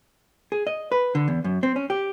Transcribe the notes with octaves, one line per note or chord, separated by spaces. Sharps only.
G#4
D#5
B4
D3
E2
F#2
C4
C#4
G4